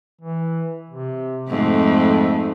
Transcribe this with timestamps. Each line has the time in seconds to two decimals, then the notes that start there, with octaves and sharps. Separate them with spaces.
0.21 E3
0.90 C3
1.48 F2 G#2 A3